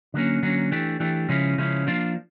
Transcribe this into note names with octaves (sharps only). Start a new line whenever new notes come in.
D3 F#3 A#3 C#4
D3 F#3 A#3 C#4
E3 A3 D4 G4
E3 A3 D4 G4
C#3 F3 G#3 C#4 E4
C#3 F3 G#3 C#4 E4
F3 A#3 D4 F4